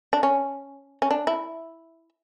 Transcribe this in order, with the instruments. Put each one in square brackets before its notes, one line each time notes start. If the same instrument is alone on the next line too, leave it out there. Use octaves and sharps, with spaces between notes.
[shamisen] D4
C#4
C#4
D4
E4